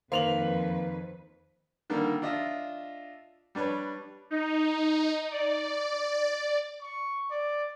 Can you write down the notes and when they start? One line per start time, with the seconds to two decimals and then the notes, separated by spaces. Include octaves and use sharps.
0.12 F2 D#3 A#3 B4 C5 F7 F#7
1.90 D3 D#3 G3 A#3
2.22 D4 F4 D#5 E5
3.55 G3 D4 B4 C#5
4.30 D#4
5.32 D5
6.82 C#6
7.31 D5